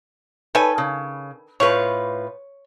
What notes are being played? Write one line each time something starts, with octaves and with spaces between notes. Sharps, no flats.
D#3 A4 B4 C#5 G#5
C#3
A2 F4 B4 C#5